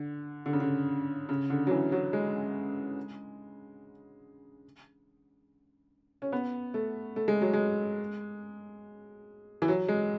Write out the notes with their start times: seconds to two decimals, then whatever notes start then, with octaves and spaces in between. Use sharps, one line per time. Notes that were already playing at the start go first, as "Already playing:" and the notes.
Already playing: D3
0.46 D3
0.53 C#3
0.60 D3
1.29 C#3
1.50 D3
1.67 F#3
1.71 E3
1.92 F#3
2.13 G#3
6.22 C#4
6.32 B3
6.74 A3
7.16 A3
7.28 G#3
7.41 F#3
7.53 G#3
9.62 E3
9.68 F#3
9.88 G#3